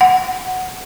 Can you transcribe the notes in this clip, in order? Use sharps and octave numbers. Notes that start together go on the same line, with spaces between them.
F#5